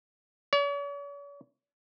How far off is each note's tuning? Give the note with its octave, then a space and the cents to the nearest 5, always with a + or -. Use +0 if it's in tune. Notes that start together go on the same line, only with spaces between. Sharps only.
C#5 +45